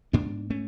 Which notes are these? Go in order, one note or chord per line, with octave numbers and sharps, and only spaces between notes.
G#2 B3 D4
A3 C#4